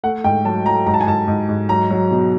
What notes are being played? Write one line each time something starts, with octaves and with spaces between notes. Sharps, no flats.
A3 F#5
G#2 G5
F#3 A5
F#3 A#5
G#2 A#5
A5
G#5
G#2 A5
G#2
G#2
F#3 A#5
F#3
B2